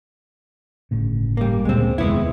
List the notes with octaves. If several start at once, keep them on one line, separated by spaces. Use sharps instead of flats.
G1 A2 C#3
G3 A#3
D2 A#2 C#3 G#3 C4
F1 D#2 G#3 B3 E4